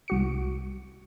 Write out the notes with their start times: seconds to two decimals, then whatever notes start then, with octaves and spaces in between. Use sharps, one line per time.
0.08 C2 F#4 C#7